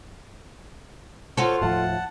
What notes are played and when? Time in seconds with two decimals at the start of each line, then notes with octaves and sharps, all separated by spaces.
1.37 F4 F#4 A4 C5 C#5 C#6
1.62 D#1 A2 F3 F#5 A5